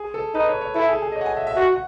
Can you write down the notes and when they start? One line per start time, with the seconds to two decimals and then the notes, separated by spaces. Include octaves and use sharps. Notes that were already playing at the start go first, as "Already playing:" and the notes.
Already playing: G#4
0.14 A4
0.34 D#4 B4
0.48 C#5
0.61 C#5
0.75 E4 A4
0.88 G#4
1.02 G#4
1.12 D#5
1.16 C#5
1.21 F#5
1.26 G#5
1.37 E5
1.47 E5
1.56 F#4 F#5
1.72 F#5